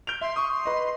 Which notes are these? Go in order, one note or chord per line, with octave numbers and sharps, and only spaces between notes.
G6 D7 F7
E5 C6
C#6 D#6
C6
B4 D#5